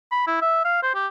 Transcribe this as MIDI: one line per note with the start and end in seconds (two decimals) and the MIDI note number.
0.12 0.26 83
0.27 0.38 64
0.42 0.62 76
0.65 0.81 77
0.83 0.90 72
0.95 1.07 67